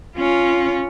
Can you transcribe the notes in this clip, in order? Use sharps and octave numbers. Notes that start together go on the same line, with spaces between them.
C#4 F4